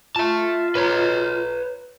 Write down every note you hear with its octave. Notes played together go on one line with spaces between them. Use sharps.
F4 E5 A5
B4 C#5